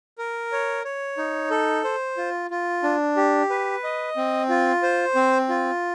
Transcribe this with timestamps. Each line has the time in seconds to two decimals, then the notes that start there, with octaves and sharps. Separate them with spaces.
0.18 A#4
0.52 C#5
0.85 C#5
1.18 D#4
1.50 A4
1.84 C5
2.17 F4
2.51 F4
2.83 D4
3.17 G4
3.50 B4
3.83 D#5
4.17 C4
4.49 F4
4.83 C5
5.15 C4
5.49 F4